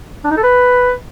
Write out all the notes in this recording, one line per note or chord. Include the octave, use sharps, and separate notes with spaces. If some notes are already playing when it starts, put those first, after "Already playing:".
D4
D#4
A4
B4